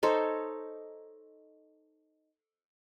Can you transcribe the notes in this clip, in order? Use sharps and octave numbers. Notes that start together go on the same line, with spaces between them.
D#4 A4 C5 C#5